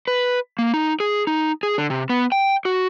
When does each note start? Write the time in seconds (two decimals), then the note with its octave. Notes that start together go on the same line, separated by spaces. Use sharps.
0.08 B4
0.59 A#3
0.74 D#4
1.00 G#4
1.27 D#4
1.63 G#4
1.78 D3
1.90 C3
2.10 B3
2.32 G5
2.65 F#4